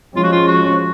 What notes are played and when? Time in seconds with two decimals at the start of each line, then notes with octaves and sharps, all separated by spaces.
0.16 F3 G#3 C#4 F4
0.23 F#4
0.32 F4
0.48 F#4